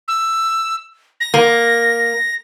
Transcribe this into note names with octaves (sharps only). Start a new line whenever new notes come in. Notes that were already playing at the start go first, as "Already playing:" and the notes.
E6
A#6
A#3